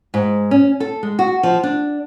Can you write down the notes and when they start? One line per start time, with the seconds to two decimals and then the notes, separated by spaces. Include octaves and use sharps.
0.14 G#2
0.51 C#4
0.80 A4
1.03 G#3
1.19 F#4
1.43 F3
1.63 D4